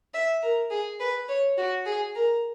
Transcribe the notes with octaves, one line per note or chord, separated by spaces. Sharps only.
E5
A#4
G#4
B4
C#5
F#4
G#4
A#4